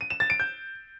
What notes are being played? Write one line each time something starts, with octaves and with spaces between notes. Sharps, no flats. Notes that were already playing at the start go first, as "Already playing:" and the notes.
D#7
E7
A6
D7
G6